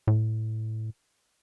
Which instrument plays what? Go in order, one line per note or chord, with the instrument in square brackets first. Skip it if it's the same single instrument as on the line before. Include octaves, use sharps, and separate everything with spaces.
[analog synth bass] A2